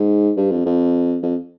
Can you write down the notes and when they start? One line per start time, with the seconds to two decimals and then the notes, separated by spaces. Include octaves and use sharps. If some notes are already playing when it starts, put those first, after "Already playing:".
Already playing: G#2
0.37 G2
0.51 F2
0.65 F2
1.22 F2